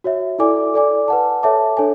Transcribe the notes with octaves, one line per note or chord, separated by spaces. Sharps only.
F#4 C#5 E5
E4 A4 D5 G#5 D6
A4 D5 G#5 D6
B4 F#5 A5
A4 C#5 E5 A5 D6
D4 A4 C#5 G#5